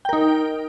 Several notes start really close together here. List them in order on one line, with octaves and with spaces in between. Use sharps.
G5 A#4 D#4